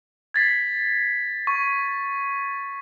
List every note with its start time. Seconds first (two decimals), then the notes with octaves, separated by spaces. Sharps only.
0.34 G#6 A6 B6 C7
1.47 C#6